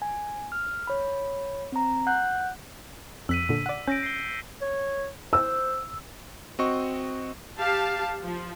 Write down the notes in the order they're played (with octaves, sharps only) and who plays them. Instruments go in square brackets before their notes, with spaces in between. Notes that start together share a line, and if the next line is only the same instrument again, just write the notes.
[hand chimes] G#5
F6
C#5 B5
C4 A#5
F#5 F#6 G6
[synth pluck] F2 F#6 [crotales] E6 B6 D#7
[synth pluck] A#2 D3
D5 F#5
[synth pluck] C#4 [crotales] G6 A#6 D7
[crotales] C7 G7
[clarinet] C#5
[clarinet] C5 [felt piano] E6
[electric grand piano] C4 F#4 D#5 C#6
[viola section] G4 F5 A5
F3